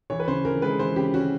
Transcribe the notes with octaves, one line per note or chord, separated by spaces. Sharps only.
E3 C#5
B4
C#3 C5
E3 A#4
G#3 B4
E3 C5
C#3 G4
C#4 F#4